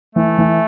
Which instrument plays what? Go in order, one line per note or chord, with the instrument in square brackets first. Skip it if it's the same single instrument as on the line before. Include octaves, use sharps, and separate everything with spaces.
[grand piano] E3 [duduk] A3
[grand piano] E3